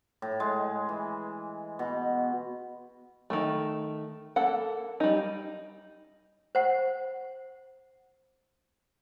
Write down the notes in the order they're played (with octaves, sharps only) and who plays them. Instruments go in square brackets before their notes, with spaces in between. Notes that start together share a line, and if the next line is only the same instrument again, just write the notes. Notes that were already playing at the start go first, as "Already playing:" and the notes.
[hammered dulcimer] A2
G#3
E3
B2
[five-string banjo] D#3 G3 A3
A#3 A4 F#5
G3 D#4
[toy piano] C5 F#5